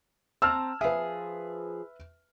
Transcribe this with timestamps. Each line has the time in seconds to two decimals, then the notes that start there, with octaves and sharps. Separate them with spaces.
0.42 C4 A5 A#5 E6 F6
0.81 F3 G#4 B4 E5